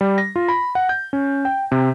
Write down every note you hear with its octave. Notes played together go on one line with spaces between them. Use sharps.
G3
A#6
F4
B5
F#5
G6
C#4
G5
C3